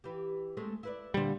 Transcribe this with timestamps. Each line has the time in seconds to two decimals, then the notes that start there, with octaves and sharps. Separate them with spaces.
0.04 E3 G4
0.57 G#3 A3 C4
0.83 E4 B4 D5
1.14 A#2 D3 G3 C5